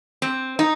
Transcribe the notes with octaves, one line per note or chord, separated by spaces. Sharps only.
C4
D#4